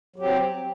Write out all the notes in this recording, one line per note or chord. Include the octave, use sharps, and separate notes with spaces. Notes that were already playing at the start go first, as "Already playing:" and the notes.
F#3 C4 G4